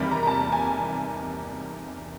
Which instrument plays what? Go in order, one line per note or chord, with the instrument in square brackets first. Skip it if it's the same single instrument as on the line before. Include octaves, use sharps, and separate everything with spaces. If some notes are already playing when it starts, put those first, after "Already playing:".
Already playing: [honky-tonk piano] E2 C3 D#3 G3 A#3 B5
A#5
A#5
A5
G#5